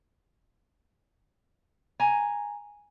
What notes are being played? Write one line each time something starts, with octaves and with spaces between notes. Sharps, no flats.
G#5 A#5